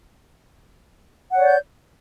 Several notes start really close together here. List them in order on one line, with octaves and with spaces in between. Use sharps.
F#5 C#5 D5 G6